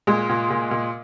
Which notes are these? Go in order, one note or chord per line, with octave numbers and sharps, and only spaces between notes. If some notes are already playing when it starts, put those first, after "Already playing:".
A#2 G#3
A#2
A#2
A#2